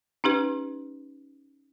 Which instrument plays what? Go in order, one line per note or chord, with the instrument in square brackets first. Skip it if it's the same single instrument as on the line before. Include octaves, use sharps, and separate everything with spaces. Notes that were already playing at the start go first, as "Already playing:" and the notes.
[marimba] C#4 D#4 G4 B4